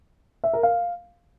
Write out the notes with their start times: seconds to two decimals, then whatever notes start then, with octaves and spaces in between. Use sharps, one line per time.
0.44 E5
0.53 A#4
0.63 F5